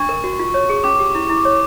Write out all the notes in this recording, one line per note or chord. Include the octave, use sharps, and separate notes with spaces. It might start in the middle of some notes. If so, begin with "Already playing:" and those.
Already playing: D4 C#6
A#4
F#4
F4
C#5
G#4
C#4 D6
G4
E4
E4
C#5